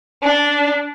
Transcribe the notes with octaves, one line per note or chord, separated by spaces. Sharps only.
D4